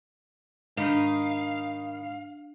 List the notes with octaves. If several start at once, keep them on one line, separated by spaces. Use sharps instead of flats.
G#2 D#3 D4 D#4 F5 B5